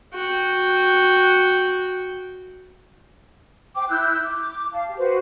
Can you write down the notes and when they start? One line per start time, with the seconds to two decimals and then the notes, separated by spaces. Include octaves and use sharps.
0.14 F#4 G5
3.75 C5 G5 D6
3.89 E4 E6 F#6 G6
4.23 D6
4.73 F5 A5
4.86 G4
4.98 F#4 B4 C5